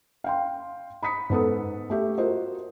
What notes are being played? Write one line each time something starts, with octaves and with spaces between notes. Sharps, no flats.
F5 G5 C6
B5 D#6 B6 C#7
G#2 B3 A4 D#6
A3 G4 E5
F4 F#4 A#4 C5 D#5